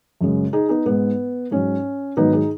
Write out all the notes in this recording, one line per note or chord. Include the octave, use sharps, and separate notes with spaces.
F#2 C#3 G#3
D#4 G#4
B3 D#4
G#2 G#3 B3
G#2 F#3 C#4
G#2 D#3 F#3 B3 D#4
D#4 G#4